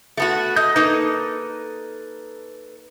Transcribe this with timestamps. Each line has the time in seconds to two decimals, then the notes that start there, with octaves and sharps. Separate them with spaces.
0.17 A3 B3 F#4
0.56 D#5 G6
0.76 A#3 D#4 A4 B4